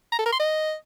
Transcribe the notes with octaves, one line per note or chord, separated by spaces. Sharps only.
A#5
A4
A#4
C6
D#5